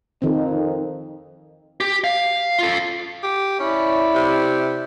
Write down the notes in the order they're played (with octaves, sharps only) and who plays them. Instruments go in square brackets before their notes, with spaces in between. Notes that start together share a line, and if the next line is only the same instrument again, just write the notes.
[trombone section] F2 D#4 [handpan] D#3 C4
[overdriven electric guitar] G4
F5
F4 A4
[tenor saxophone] G4
[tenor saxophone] C#4 [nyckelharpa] E4 D5
[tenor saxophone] C3